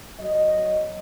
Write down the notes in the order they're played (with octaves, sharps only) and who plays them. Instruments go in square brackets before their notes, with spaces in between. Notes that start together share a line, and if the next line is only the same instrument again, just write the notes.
[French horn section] F#3 D#5